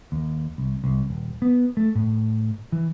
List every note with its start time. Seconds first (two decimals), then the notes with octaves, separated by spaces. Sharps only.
0.12 D#2
0.58 C2
0.84 C2
1.10 D#1
1.42 B3
1.77 A3
1.95 A2
2.72 E3